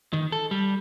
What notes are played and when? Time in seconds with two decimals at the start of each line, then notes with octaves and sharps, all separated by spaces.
0.13 D#3
0.32 A4
0.51 G3